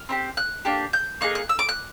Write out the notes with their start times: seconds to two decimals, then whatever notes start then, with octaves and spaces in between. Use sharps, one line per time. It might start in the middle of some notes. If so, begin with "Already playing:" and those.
Already playing: F6
0.09 C4 D#4 G4
0.37 F#6
0.65 A#3 D4 G4
0.93 G6
1.21 A#3 D#4 G#4 F#6
1.35 F#6
1.49 E6
1.59 D6
1.69 F#6